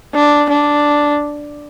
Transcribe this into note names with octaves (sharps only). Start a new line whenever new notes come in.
D4
D4